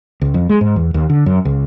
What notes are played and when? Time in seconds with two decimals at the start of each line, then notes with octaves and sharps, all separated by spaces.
0.21 C#2
0.34 F2
0.49 G#3
0.61 G#2
0.76 E2
0.94 D#2
1.10 D3
1.26 F#2
1.45 C#2